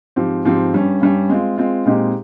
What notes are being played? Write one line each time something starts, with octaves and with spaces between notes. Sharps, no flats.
G#2 F3 C4 G4
G#2 F3 C4 G4
G2 G3 C#4
G2 G3 C#4
G#3 C4 F4
G#3 C4 F4
A#2 G#3 C4 D#4 G4